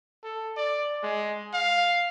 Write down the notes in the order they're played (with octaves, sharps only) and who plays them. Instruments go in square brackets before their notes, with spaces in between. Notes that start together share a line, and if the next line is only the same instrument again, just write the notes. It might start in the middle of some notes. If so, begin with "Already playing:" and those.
[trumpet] A4
D5
G#3
F5